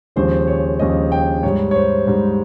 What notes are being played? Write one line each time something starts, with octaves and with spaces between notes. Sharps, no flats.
D#2 C#3 F3 G#3 C5
C#5
D#2 C#3 F3 G#3 D#5
G5
G#2 G3 C#5
C#5
C5
G#2 G3